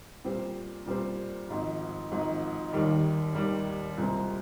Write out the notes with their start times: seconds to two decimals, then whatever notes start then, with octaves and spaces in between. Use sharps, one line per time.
0.24 A#2 G3 C4 G4 C5
0.86 A#2 G3 C4 G4 C5
1.49 G#1 G#2 F3
2.11 G#1 G#2 F3
2.73 D#2 D#3 G3
3.35 D#2 D#3 G3
3.98 C2 A#2 G#3 C4